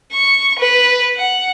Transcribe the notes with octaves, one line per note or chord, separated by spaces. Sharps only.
C#6
B4
F#5